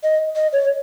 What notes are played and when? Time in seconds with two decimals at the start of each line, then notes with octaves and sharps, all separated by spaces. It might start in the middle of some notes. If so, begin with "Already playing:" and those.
0.04 D#5
0.36 D#5
0.53 C#5